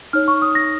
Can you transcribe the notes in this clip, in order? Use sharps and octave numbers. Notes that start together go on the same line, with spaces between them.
D#4 C#5 F6
C#6
D#6
A#6